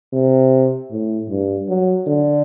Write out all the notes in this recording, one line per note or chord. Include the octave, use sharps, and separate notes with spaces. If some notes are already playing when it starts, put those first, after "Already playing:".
C3
A2
G2
F#3
D3